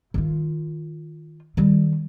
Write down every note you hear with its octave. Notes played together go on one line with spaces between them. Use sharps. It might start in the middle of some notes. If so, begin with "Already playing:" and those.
D#3 F4
D#3 G3